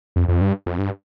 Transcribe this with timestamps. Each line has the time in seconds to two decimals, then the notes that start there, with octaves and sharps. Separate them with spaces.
0.16 F2
0.28 F2
0.41 G2
0.66 F2
0.79 G2